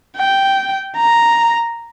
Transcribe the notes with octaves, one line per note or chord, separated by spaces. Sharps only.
G5
A#5